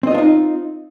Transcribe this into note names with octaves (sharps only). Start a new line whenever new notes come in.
C4 D4 D#4 F4 D#5